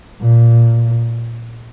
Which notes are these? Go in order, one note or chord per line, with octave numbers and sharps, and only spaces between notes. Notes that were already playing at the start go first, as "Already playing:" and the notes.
A#2